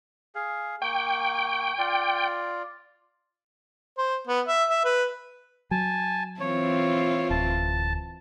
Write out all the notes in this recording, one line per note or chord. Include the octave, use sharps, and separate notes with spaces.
G#4 F5
A#3 G5 C#6
F4 D5
C5
B3
E5
E5
B4
F#3 G#5 A5
E3 C4 F4 C#5
D1 A5